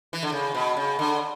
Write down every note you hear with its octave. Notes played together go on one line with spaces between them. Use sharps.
E3
D3
C#3
B2
C#3
D3